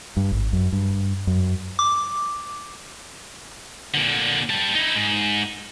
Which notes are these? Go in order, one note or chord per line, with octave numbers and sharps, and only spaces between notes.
G2
G#1
F#2
G2
F#2
D6
A#2 D3
G3 A5
D#4 E4
G#2